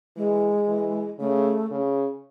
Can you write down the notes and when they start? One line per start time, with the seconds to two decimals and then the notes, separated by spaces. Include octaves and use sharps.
0.16 E3 G#3
0.68 E3
1.19 C#3 A3
1.71 C#3